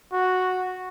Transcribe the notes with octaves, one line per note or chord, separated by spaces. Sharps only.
F#4